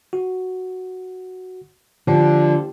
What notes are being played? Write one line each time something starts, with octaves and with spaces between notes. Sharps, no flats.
F#4
D3 F3 A#3 G4